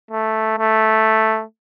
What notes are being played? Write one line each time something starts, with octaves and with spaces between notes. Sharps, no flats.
A3
A3